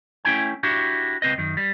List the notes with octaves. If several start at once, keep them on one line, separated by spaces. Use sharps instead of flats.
A3 C#4 E4 G5 G#5
D4 E4 F#4 G4
C#2 C4 B4 D#5
F#2 D#3
G3